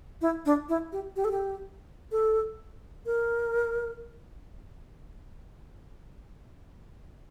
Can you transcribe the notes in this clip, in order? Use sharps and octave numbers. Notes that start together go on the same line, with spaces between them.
E4
D4
E4
G4
G4
A4
G4
A4
A#4